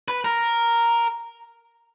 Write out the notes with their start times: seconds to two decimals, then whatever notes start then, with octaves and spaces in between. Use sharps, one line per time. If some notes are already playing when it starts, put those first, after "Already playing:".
0.08 B4
0.24 A#4